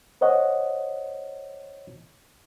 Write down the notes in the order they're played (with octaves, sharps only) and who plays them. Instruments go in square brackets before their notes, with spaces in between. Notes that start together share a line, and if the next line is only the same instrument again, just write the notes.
[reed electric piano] C5 C#5 D#5 F#5